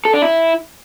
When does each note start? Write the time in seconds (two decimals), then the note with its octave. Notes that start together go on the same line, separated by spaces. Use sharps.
0.05 A4
0.14 D4
0.22 E4